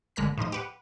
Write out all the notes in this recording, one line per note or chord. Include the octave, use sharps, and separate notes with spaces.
G1 D3 G#3 A#4 F#6 B6
A2 F3 D#4 D#5
G4 B4 F#5